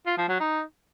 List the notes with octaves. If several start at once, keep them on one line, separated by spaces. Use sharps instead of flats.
F4
F3
F#3
D#4